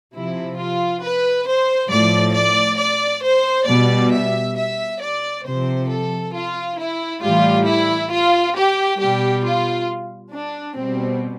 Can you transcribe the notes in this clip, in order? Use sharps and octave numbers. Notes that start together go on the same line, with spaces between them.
C3 F3 E4
F4
B4
C5
A2 F3 D5
D5
D5
C5
B2 G3 D5
E5
E5
D5
C3 F3 C5
A4
F4
E4
A2 E3 G3 F4
E4
F4
G4
B2 G3 G4
F4
D4
B2 G3 C4